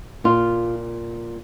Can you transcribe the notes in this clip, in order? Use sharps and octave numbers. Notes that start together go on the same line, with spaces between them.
A#2 F4